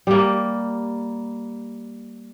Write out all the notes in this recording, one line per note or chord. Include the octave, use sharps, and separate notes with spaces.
G3 A#3